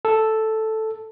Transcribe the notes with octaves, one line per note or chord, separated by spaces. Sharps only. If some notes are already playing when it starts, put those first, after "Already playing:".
A4